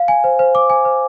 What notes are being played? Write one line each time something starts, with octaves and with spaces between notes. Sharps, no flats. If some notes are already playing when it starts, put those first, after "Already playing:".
Already playing: F5
G#5
C5
C5
D6
G#5
C5